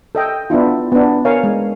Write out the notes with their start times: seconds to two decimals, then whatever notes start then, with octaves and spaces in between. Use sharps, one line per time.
0.15 A4 D#5 G5
0.50 B3 D4 E4 F4
0.92 B3 D4
1.25 A#4 C#5 F5 G#5
1.44 G#3